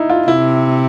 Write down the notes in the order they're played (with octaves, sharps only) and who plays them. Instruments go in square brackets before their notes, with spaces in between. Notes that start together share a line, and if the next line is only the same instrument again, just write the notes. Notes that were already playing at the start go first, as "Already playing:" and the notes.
Already playing: [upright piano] D#4 E4
F4
[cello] C3 [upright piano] E4